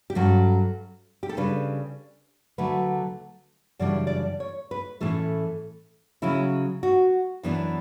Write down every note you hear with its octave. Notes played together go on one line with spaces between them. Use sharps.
G4
G2 F#3 C#4 A4
G4
A4
C#3 G3 D4 B4
D2 D3 F#3 A3 B4
F#2 C#3 E3 G3 D4 D5
D5
C#5
B4
A2 E3 A3 C#4 A4
C#3 F#3 C#4 E4
F#4
F#2 E3 B3 D4